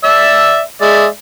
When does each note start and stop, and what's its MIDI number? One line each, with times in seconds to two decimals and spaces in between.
0.04 0.60 74
0.04 0.60 76
0.04 0.60 88
0.81 1.06 56
0.81 1.06 74
0.81 1.06 76